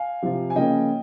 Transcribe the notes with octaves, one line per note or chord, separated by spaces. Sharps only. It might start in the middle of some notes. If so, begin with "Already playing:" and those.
Already playing: F5 G#5
C3 F3 C4 F4
G#5
C#3 F3 A#3 C#4 D#5 G5